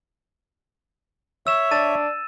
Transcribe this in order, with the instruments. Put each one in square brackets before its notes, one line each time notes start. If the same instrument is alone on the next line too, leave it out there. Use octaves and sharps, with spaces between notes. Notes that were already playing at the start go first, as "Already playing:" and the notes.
[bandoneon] C#5 E5 [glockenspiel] E6 E7
[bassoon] D4 [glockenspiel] A6 D#7